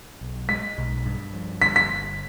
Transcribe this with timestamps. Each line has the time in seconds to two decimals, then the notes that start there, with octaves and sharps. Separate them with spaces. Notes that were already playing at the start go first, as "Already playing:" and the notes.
0.21 B1
0.49 G#3 B6
0.78 B1
1.05 G2
1.33 F3
1.61 G1 B6
1.76 B6